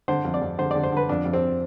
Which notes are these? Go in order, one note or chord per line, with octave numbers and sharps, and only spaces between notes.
D3 C5
F2
D5
F2
D3 C5
D3 D5
C5
D3 B4
F2 D4
F2
C4